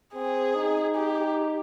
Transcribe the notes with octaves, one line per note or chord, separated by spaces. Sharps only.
C4 G#4
D#4
G4